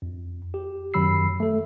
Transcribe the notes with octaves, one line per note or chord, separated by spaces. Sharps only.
F2
G4
F#2 D#3 F#3 B5 E6 C7
A3 A4